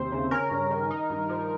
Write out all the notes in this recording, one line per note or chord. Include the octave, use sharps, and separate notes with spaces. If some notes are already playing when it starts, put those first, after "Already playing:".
Already playing: D#2 C3 C4 C5
C#3
C#4 A#4
G2
D#3
D#4
G2
F3